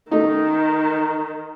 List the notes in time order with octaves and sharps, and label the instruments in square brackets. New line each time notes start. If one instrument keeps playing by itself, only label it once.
[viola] D#3 [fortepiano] A3 D#4